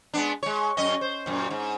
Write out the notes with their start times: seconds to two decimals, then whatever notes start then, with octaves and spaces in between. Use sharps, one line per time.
0.14 G#3 B3 D4
0.43 G#3 C#5
0.77 F#2 C#4 D#5
1.01 C5
1.26 F#2 A#2
1.51 G#2